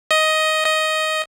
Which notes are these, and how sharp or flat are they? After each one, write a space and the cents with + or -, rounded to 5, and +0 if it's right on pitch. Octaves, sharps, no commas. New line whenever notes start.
D#5 +10
D#5 +10